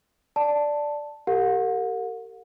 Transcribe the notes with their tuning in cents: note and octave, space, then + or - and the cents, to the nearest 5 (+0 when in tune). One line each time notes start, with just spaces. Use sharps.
D5 +0 A5 +0
G4 +0 A#4 -40 F#5 -40